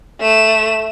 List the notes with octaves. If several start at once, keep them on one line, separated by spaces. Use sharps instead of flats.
A3 E7